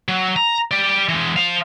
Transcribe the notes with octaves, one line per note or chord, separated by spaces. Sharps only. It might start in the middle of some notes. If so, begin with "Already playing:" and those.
F#3
A#5
G4 D5
E3 G#3
C5 F5